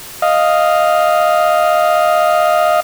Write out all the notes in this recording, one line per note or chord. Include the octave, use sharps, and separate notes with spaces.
D#5 F5